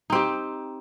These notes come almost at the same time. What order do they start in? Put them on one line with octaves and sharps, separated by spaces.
D#4 C4 G4